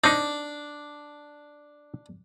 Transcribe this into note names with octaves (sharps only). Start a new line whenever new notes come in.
C4 D4 D#4